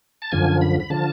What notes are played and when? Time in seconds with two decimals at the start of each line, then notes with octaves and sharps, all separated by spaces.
0.22 A5
0.32 F#2 D3 F3 G#5
0.61 B5
0.80 B5
0.90 D3 F3 A5